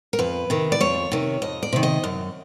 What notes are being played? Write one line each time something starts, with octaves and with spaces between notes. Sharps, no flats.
A#4
F2 B4
C3 D#3
D5
F2 C#5
C3 D#3
F2 D#5
D5
C3 D#3
D#5
F#2